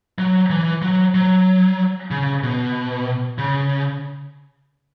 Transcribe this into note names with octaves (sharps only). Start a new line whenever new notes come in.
F#3
E3
F#3
F#3
C#3
B2
C#3